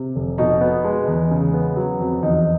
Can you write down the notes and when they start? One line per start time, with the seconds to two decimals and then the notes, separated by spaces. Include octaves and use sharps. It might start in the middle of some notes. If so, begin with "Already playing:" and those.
Already playing: C3
0.16 F1
0.38 B2 D#4
0.61 B3
0.84 G#3
1.08 E2
1.31 C#3
1.53 B3
1.76 F#3
2.00 F2
2.22 E2 D#4